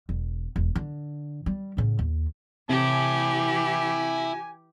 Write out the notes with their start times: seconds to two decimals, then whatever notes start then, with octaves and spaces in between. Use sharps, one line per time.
0.09 E1
0.56 E1
0.75 D3
1.46 G3
1.77 A2 C#3
1.99 D#2
2.70 C3 E3 E4 G4 G#5 A5